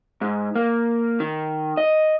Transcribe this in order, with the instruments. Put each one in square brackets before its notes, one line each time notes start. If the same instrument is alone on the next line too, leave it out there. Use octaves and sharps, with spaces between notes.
[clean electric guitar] G#2
A#3
D#3
D#5